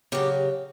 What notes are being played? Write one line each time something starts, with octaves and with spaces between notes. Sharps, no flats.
C#3 F#3 G4